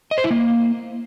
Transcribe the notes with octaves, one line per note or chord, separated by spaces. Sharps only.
D#5
C5
E4
A#3